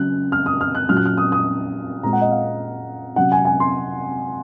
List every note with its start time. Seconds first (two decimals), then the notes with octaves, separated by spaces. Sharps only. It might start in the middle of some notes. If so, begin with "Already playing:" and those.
Already playing: C#3 F#3 C#4 F#6
0.32 F6
0.46 D#6
0.61 F6
0.75 F#6
0.89 A#2 F#3 C#4 F6
0.97 F#6
1.06 F6
1.17 D#6
1.32 D#6
2.03 A#2 G#3 C4 A#5
2.13 F#5
2.21 D#5
2.32 F5
3.16 C3 F#3 C#4 F#5
3.32 G#5
3.45 G#5
3.60 C6